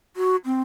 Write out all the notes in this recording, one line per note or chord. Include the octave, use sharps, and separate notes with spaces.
F#4
C4